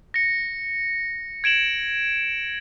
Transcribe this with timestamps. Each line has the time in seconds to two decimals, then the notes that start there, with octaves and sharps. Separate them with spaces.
0.14 A#6 C#7
1.44 G#6 D7 E7 F#7